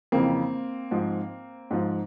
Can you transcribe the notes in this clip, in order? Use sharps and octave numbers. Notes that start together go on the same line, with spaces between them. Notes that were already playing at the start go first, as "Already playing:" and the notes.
F2 C#3 E3 A#3 C4
G#2 F3
G#2 F3